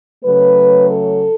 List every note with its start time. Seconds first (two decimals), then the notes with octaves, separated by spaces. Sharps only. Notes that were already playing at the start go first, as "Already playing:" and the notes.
0.24 C#3 F#3 A3 B4
0.89 A4